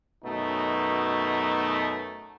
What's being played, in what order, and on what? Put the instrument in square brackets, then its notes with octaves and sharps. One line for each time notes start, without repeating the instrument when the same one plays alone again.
[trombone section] F#2 B2 A3 D#4